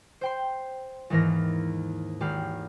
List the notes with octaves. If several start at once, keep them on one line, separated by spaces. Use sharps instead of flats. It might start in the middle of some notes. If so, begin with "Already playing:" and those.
C5 G5 C6
D#2 G#2 E3 A#4 F6 A#6
G#1 G4 B5 F6 C7